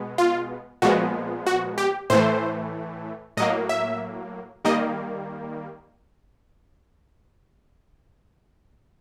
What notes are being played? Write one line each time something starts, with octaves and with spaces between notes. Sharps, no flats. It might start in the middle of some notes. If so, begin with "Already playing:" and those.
Already playing: B2 G#3 B3
F4
A#2 F3 G#3 B3 F#4
F#4
G4
A2 E3 A3 C5
A2 F#3 A#3 D#5
E5
D#3 G3 A#3 D#5